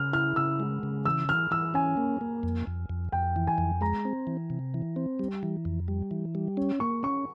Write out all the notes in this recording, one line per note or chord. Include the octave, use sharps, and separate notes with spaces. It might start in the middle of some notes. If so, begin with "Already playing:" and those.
Already playing: C#3 F6
E4 F6
C#3 E6
G#3
C#3
E3 E6
E3 F6
E3 E6
C#4 G#5
A#3
A#3
F2
F2
F2
F2 G5
E3
G#5
F2
G#3 A#5
C4
E3
C3
E3
C4
G3
E3
F2
G3
E3
G3
C#4
A#3 C#6
C#4 C#6